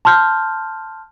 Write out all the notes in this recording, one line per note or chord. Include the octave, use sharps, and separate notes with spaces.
A5 C6 F6 G6